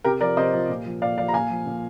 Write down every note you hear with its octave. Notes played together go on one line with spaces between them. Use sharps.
C3 G4 A#4
F3 A#4 D5
C3 C5 D#5
F3
A#2
F3
A#2 D5 F5
F3 D5 F5
A#5
A#2 F5 G#5
F3
A#2